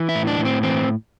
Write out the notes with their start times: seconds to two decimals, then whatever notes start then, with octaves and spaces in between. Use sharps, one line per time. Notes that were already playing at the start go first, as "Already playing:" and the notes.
Already playing: E3
0.09 E4
0.15 A2
0.27 D4
0.39 A2
0.45 C4
0.63 E3 C4